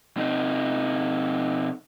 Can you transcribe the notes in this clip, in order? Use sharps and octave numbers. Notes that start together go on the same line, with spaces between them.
C3 D#4